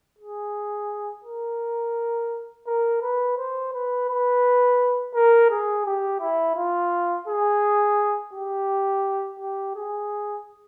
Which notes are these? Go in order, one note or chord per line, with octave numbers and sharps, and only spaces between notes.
G#4
A#4
A#4
B4
C5
B4
B4
A#4
G#4
G4
E4
F4
G#4
G4
G4
G#4